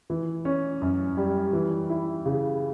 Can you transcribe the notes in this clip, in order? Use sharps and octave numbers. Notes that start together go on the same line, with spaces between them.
E3
C#4
F#2
G3
E3
E4
C#3